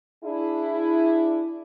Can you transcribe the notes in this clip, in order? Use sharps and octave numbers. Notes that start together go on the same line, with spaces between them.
D4 E4 G#4